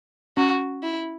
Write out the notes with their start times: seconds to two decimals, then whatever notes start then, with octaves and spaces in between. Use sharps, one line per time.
0.37 C#4 F#4
0.83 E4